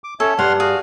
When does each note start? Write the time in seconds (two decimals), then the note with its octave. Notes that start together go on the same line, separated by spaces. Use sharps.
0.04 D6
0.20 C#4 A4 C#5 E5
0.39 G2 D5 F#5 C6 F6
0.60 F#4 G#4 F5